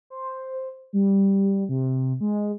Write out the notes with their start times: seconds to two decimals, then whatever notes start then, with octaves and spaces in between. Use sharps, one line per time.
0.10 C5
0.93 G3
1.69 C3
2.21 G#3